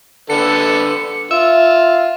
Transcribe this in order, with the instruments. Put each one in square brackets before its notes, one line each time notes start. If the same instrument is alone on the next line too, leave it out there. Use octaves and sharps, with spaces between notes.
[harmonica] D3 A4 B4 [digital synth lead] C#7
[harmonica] F4 [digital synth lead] E5